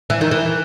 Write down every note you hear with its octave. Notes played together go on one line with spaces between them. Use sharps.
E3
D#3
E3